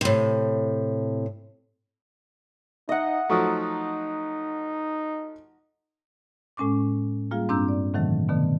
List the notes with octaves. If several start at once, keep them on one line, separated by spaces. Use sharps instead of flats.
A2 C3
D#4 D#5 E5 F#5
F3 F#3 A3 D#4 A#5 C#6 D#6
A2 G#3 C#4 C#6 D6
G3 A#3 F4 G#4 F5
G2 C4 D4 A#5 E6 G6
D5
A2 C3 D#3 E3 F#3 A3
B2 D3 D#3 A3 B3